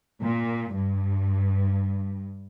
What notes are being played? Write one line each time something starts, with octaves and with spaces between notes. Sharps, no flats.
A#2
G2